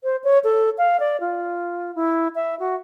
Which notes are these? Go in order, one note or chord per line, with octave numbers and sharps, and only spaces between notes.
C5
C#5
A4
F5
D5
F4
E4
E5
F#4